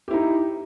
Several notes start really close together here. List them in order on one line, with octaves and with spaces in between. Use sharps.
G4 E4 D#4